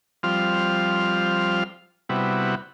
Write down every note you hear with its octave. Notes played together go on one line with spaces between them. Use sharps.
F3 G3 C4 F4 F6
C3 G3 B3 E4 F#4